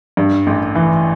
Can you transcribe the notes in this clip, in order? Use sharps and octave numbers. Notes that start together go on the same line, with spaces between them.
G2
A1
E3